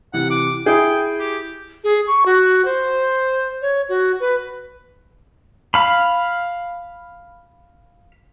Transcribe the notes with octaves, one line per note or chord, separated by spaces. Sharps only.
C3 E3 F#5
D6
E4 G#4 G5
G4
G#4
C#6
F#4
C5
C#5
F#4
B4
F5 B5